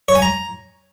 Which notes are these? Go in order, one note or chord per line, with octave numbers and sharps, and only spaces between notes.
C#5
G#5
A#5